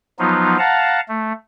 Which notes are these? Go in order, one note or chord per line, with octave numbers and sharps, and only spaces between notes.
F3 F#3 B3 D#4 F4
F5 F#5 A5 A#5
A3